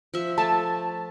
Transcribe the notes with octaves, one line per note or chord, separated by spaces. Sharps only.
F3 E5
A3 A5